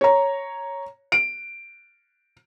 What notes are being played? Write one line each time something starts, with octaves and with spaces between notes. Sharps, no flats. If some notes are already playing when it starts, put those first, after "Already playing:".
C#5 A#5
D7